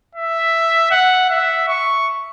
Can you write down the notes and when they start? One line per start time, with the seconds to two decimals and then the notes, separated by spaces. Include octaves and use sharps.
0.15 E5
0.91 F#5
1.30 E5
1.68 C#6